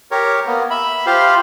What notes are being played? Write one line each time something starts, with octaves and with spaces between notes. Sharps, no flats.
G4 A#4 C#5
A#3 B3
E5 B5
F4 G4 C5 F5